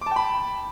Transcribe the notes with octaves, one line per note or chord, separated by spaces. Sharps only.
G5 A5 B5 D6